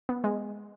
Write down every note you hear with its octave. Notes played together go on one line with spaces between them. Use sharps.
B3
G#3